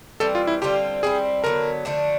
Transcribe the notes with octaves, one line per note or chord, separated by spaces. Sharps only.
E3 G3 C4 A4
F4
E4
D3 G3 C4 F4 G4
G3 C4 E4 G#4
D3 F#3 B3 A#4
D3 F3 A3 D4